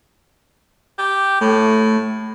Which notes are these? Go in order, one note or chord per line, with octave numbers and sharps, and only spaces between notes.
G4
A2 A3